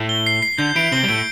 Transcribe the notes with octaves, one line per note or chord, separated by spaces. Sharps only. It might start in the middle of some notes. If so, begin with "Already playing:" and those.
Already playing: A2 A3
G7
C7
C7
D3 D4 G6
E3 E4 D7
C3 C4 G7
G3
A2 A3 D7